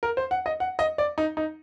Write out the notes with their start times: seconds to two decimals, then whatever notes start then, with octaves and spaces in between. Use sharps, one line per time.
0.03 A#4
0.17 C5
0.31 F#5
0.46 D#5
0.60 F#5
0.79 D#5
0.98 D5
1.18 D#4
1.37 D#4